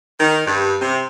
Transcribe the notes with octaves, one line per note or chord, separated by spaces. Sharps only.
D#3
G2
C3